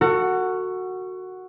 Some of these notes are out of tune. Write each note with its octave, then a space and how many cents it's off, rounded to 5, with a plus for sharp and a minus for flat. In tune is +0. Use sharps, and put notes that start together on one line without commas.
F#4 +0 A4 +40